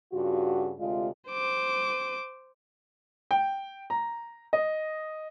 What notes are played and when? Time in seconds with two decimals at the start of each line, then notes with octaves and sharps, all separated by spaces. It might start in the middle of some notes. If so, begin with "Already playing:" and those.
0.12 G2 C#3 F4 F#4
0.79 D2 C3 G#3 F4 G4 D5
1.30 C5 D6
3.31 G5
3.90 A#5
4.53 D#5